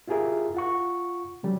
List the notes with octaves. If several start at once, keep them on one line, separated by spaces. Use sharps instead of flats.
E4 F4 G4 G#4 A#4 E5
F4 F#5 C#6
D3 F#3 G3 C#4